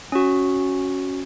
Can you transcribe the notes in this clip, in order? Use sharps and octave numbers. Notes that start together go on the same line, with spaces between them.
C#4 F#4